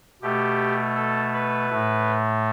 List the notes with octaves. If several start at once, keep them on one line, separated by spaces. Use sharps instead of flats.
B2 A3 G4
A4
B4
A2 A3